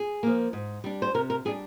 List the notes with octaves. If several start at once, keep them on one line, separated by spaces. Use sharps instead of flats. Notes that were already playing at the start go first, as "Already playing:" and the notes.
Already playing: G#4
F3 A#3
G#2
G3 D4
C5
C3 A#4
A#4
G3 D4 G#4